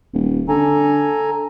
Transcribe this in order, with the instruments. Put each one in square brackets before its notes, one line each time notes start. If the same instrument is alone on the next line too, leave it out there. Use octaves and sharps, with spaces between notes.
[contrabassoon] D#1
[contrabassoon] D3 [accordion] A4 G#5 A#5